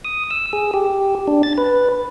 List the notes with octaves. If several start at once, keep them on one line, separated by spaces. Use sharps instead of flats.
D#6
E6
G#4
G4
D4
A6
B4